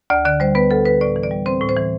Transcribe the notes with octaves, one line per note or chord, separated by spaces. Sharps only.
D2 D5
D3 D5
G3 C5
B3 B4
D2 A4
D3 B4
A2 D5
E3
D5
G3
C4 C5
A2
C5
E3